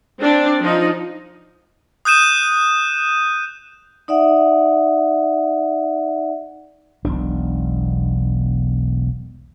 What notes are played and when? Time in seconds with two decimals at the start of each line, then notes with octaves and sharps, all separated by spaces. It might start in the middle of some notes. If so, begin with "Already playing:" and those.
0.19 C4 D4
0.61 F3 D#4
2.05 D#6 F#6 G6 D#7 E7
4.08 D#4 D5 E5 F#5
7.05 E1 B1 D4